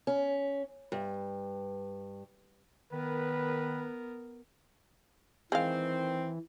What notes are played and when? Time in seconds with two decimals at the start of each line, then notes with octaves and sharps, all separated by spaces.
0.07 C#4
0.92 G2
2.92 D#3 B3 A#4 B4
5.52 D#3 E3 G#3 C4 F5